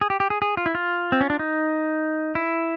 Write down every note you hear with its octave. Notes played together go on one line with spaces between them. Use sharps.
G#4
G4
G4
G#4
G#4
F4
E4
F4
C4
C#4
D4
D#4
E4